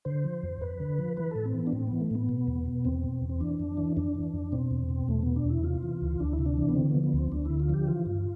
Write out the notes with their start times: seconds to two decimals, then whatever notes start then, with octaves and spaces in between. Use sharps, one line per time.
0.05 D3 C5
0.24 F3
0.43 F2
0.61 F2 B4
0.80 D3
0.99 F3
1.17 E3 B4
1.31 A2 A4
1.45 C4
1.54 E3 B3
1.67 D4
1.73 A2 C4
1.87 E3 B3
2.01 A3
2.11 A2 B3
2.29 B2
2.47 E2
2.66 B2
2.85 E2 C4
3.04 B2
3.22 E2
3.29 C4
3.40 E3 D4
3.59 F2
3.77 E3
3.97 F2 D4
4.15 E3
4.34 F2
4.52 B2 C4
4.71 E2
4.89 B2
5.08 E2 A3
5.22 B2 B3
5.36 D4
5.45 E2 E4
5.64 C3 F4
5.83 E3
6.01 D2
6.20 D2 D4
6.33 E4
6.39 C3
6.46 D4
6.57 E3
6.69 B3
6.75 D3 C4
6.90 F3 B3
7.04 B3
7.13 D2 C4
7.32 D2 D4
7.45 D3 E4
7.60 F4
7.69 F3 G4
7.87 E3 F4
8.06 G2